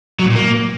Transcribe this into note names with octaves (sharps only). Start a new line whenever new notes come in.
F#3
A2
A#2
A#3